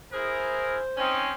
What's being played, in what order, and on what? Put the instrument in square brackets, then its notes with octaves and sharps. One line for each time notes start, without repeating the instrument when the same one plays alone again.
[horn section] E4 G#4 A#4 [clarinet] C5
[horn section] C4 C#4 D#4